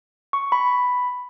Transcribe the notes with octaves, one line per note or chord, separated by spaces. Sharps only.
C#6
B5